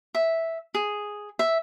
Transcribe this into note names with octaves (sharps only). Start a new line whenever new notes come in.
E5
G#4
E5